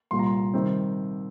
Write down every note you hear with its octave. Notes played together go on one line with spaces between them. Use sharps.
C2 A#2 G3 C6
A#5
C6
C3 D#3 G3 C4